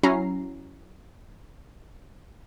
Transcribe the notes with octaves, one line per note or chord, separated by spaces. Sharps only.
F#3 C#4 E4 A#5 C7